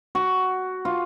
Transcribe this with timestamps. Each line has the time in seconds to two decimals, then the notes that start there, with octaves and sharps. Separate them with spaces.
0.15 F#4
0.85 F4